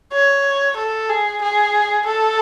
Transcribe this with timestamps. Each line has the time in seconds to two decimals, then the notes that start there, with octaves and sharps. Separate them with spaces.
0.13 C#5
0.77 A4
1.10 G#4
1.42 G#4
2.07 A4